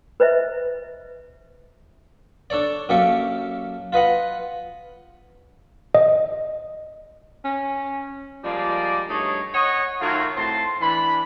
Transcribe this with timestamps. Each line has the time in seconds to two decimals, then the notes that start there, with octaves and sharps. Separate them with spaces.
0.20 B4 C5 D#5 E5
2.50 D4 A4 C#5 D5
2.89 F#2 A#3 G4 A4 C#6
3.93 F4 B4 D#5 F#5
5.95 D#5
7.45 C#4
8.44 F3 G3 G#3 A#3 D5
9.09 G2 A3 D#4 G#4 C#5
9.53 C#5 D#5 F#5
10.00 D#3 F#3 A3 F4 F#4 A#4
10.37 A2 C4 A5 C6
10.81 E3 D4 B5